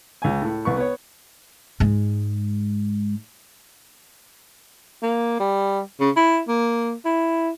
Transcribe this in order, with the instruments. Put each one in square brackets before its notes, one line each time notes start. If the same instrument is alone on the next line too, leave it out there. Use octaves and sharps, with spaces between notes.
[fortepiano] C#2 G#5
A2
C2 B4 C#6
B3 C#5
[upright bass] G#2 G#3
[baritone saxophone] A#3
G3
C#3
E4
A#3
E4